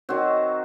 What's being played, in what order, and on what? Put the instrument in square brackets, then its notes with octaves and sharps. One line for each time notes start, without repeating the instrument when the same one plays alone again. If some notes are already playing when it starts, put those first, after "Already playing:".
[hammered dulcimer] D#3 F#3 C4 F#4